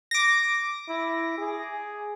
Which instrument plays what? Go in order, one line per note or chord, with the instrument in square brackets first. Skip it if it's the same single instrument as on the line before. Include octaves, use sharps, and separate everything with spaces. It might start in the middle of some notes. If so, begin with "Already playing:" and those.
[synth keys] D6 A#6
[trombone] E4
G#4